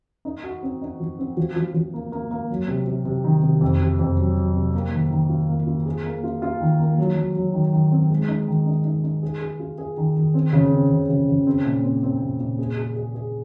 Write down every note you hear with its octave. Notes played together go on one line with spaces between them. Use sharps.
D#4
F#4
C4
D#4
F3
C4
F3
F3
F3
A#3
A#3
A#3
F#3
C3
C3
C3
D#3
C3
F2
C3
F2
F#3
F#3
C3
A#3
D#3
D#3
F4
A#3
F4
G#4
A#3
F4
F4
D#3
A#3
F#3
F#3
F#3
D#3
D#3
C4
G#3
D#4
D#3
D#4
D#4
D#4
G#4
G#4
F4
G#4
D#3
D#3
C4
C#3
C4
C#3
C#3
C#3
C4
A#2
C4
C4
A#2
A#2
G#4
G#4
G#4
G#4